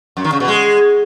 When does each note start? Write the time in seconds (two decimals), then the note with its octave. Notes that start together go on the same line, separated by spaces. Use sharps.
0.17 F#2
0.24 D#3
0.32 C#3
0.40 B2
0.48 G#3